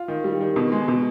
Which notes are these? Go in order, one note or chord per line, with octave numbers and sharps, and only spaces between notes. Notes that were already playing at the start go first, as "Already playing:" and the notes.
Already playing: F4
D#3
G3
D#3
B2
G#3
B2